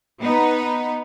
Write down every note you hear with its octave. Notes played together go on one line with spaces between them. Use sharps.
B3 D#4 B4